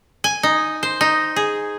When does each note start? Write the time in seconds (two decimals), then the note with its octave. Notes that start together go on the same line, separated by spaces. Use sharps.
0.24 G#5
0.43 D#4
0.83 C5
1.01 D#4
1.36 G#4